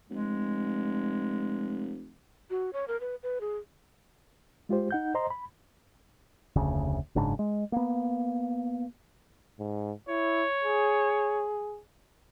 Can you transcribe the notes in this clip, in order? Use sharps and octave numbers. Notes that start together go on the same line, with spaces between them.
F1 G#3
F#4
C#5
A#4
B4
B4
G#4
G#3 F4 G4 C5
D#4 F#5 G6
C5 D#5 A#5 C6
B5
F1 D2 C#3
F#1 G#2 C#3 D4
G#3
A#3 B3
G#2
E4 C#5
G#4